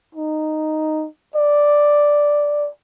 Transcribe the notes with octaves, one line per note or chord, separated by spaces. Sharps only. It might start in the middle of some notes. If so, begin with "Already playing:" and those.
D#4
D5